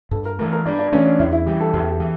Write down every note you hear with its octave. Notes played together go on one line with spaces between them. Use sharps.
G2 A4
A#4
E3 A3 A#4
A#4
G2 D4
D4
E3 A3 C#4
D4
E2 E4
E4
E3 G3 G4
A4
E2 G4
G4
E3